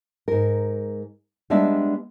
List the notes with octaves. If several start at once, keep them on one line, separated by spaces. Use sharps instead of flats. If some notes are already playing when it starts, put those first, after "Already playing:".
G#2 A#4
G3 G#3 B3 D4 D5 E5